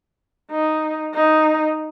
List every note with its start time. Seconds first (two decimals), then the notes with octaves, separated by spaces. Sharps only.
0.51 D#4
1.14 D#4